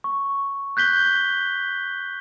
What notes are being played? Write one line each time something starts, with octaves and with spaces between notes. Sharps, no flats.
C#6
F#6 G6 B6 G7